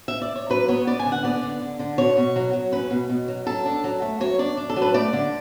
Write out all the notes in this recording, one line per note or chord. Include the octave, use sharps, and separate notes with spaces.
E5
D5
C#5
F#3 B4
B3 C#5
B3 D5
G#5
D3
F#5
B3 D5
D3
D3
D3
B2 C#5
B2
F#3
F#3
C#4 B4
B2
B2
F#3
F#3 A4
D4
F#3
A3
F#3 C#5
D4 D5
D4
A4
F#3
B4
A3 D5
D3